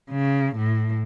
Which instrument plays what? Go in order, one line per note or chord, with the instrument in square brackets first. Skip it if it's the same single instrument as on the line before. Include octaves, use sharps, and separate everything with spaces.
[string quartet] C#3
A2